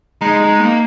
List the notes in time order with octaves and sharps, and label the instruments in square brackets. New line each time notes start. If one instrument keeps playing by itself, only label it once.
[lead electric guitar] G#3 [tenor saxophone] D#4
[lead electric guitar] G#3
A#3